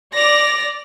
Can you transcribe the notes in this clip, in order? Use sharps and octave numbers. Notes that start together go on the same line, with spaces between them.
D5 A#6 F7